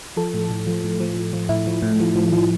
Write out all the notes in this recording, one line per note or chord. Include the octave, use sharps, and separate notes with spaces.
F3 A4
A2
A2
F3
A2
F3
A2
F3
A2 E4
F3
A2
F3
F3
F3